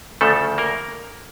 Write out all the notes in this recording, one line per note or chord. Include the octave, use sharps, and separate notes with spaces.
D2 C#3 F3 A3 A4
A#3 A#4